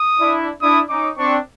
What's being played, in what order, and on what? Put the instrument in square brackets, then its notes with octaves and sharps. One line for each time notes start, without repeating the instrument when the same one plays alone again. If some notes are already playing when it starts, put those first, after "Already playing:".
Already playing: [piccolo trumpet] D#6
[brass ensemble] D4 E4
[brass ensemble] D4 E4 [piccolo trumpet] D#6
[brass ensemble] C#4 D#4 [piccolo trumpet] D6
[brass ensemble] C4 D4 [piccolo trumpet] C#6